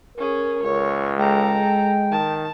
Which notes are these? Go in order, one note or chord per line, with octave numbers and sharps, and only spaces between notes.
C#4 G#4 A#4
C#2 C#5
G#3 A4 G5 A#5
D#3 A5